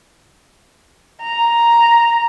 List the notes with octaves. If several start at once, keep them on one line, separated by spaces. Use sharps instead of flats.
A#5